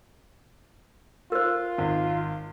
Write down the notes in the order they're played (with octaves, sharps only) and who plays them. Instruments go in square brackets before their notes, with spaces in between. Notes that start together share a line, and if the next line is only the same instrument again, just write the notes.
[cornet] F4 [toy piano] A#4 C5
[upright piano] G#1